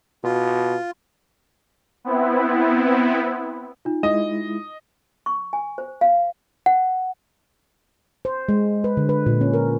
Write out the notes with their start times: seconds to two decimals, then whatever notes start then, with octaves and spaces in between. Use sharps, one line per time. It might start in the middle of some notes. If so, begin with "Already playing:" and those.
0.24 B2 F4
2.04 B3 C4 E4
3.85 D#4 F4
4.03 G#3 E4 D#5
5.26 C#6
5.53 G#5
5.78 C5
6.01 F5
6.66 F#5
8.25 C5
8.49 G#3
8.84 B4
8.97 D3
9.09 B4
9.26 A#2
9.41 C#4
9.53 A#4